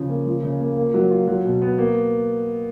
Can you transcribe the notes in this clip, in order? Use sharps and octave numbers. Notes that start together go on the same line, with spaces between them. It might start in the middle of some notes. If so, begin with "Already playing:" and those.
Already playing: C#3 F3
A#3
F3
C#3
A#3
A#3
F#3
F4
F#3
B2
B3
A#3